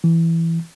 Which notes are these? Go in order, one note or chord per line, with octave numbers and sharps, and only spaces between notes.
E3